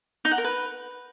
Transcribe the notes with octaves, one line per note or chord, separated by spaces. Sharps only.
D#4
F#5
A#4
B4